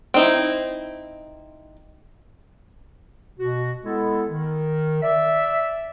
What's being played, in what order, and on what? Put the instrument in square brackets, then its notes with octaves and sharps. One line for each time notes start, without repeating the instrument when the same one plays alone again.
[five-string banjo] C4 D#4 E4
[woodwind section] B2 F#4
G#3 B3 E4 A4
D#3
D5 E5